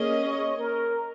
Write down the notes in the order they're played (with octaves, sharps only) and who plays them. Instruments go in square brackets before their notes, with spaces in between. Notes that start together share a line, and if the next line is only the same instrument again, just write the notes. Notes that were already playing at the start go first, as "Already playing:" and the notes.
Already playing: [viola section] A#3 C#4 G#4 D#5
[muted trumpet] C#5
A#4